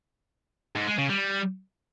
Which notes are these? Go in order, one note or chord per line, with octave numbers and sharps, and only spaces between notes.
G#2
G#3
C#3
G3